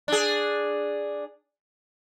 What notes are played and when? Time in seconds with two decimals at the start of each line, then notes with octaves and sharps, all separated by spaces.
0.08 D4 G#4